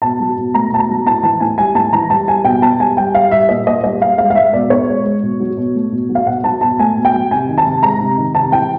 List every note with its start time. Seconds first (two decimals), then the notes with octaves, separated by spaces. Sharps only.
0.02 B2 A5
0.20 F#3
0.37 B2
0.54 A3 A#5
0.71 B2 A5
0.79 A#5
0.89 F#3
1.06 A2 A5
1.23 E3 A5
1.40 A2 G#5
1.57 G3 G#5
1.75 A2 A5
1.93 E3 A#5
2.10 G3 A5
2.27 G3 G#5
2.45 B2 G5
2.62 B2 A5
2.79 G3 G#5
2.97 G3 G5
3.15 G3 F5
3.31 G3 E5
3.49 A#2 D#5
3.67 A#2 D#5
3.84 G3 D#5
4.00 G3 F5
4.18 G#3 F5
4.30 F5
4.35 G#3 E5
4.53 B2 D5
4.70 B2 C#5
4.88 G#3
5.05 G#3
5.23 B2
5.40 F#3
5.57 B2
5.75 A3
5.92 B2
6.09 F#3
6.15 F5
6.26 B2 F#5
6.44 F#3 A5
6.61 B2 A5
6.79 A3 G#5
6.97 B2
7.05 G5
7.14 F#3
7.31 C3 G#5
7.49 D#3
7.58 A5
7.66 C3
7.83 G#3 A#5
8.00 C3
8.18 D#3
8.35 C3 A5
8.52 E3 G5